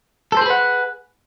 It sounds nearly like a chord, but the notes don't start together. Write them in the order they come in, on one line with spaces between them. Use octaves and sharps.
A4 C5 G#4 B4 F#5